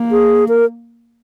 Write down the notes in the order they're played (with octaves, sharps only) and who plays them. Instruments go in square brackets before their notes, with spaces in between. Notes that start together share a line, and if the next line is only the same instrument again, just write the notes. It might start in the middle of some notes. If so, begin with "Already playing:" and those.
Already playing: [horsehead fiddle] A#3
[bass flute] G#4
A#4